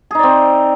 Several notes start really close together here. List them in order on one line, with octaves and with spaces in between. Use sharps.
G#4 D#4 D5 C4